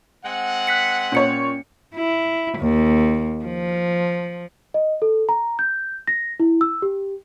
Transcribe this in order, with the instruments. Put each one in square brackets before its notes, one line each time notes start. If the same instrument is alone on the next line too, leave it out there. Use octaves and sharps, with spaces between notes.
[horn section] G#3 C4 F#5
[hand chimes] F#6 B6 C#7
[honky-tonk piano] A#2 C#5 [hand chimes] C#4 C#7
[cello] E4
D#2
F3
[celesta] D#5
A4
A#5
G6
A#6
E4
E6
G4